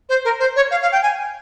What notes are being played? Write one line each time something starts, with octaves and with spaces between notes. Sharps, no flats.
C5
A#4
C5
C#5
F5
F5
G5
G#5